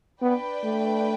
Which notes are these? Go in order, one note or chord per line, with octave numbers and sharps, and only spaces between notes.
B3 D4 B4 D5 G5
A3